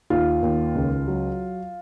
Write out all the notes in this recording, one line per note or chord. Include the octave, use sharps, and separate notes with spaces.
D#2 F4
D#2
C#2
F#3